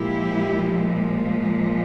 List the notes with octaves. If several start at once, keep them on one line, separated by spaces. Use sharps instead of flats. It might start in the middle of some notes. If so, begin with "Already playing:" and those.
Already playing: A#2 F3 G#3 E4 G4